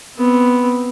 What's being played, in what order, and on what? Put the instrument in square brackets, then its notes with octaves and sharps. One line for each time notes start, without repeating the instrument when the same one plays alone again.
[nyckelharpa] B3 C4